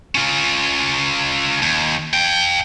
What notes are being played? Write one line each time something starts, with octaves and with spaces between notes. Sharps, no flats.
C#4 F4
D#2
F5 G5